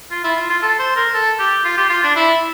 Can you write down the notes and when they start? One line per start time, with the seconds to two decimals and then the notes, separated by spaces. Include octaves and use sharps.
0.11 F4
0.24 E4
0.36 F4
0.50 F4
0.62 A4
0.79 C5
0.96 A#4
1.14 A4
1.39 G4
1.64 F4
1.77 G4
1.90 F4
2.04 D4
2.16 E4